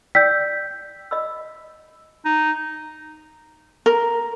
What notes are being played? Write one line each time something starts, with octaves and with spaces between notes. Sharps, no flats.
D5 G5 E6 G6 B6
D#5 B5 E6
D#4
A#4